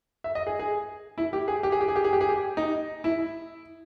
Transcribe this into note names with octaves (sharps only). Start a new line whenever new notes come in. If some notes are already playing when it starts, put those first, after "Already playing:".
E5
D#5
G#4
G#4
E4
G4
G#4
G4
G#4
G4
G#4
G4
G#4
G4
G#4
G4
D#4
E4